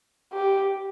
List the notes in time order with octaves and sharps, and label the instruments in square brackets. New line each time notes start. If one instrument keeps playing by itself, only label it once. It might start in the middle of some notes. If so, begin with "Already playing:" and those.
[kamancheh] G4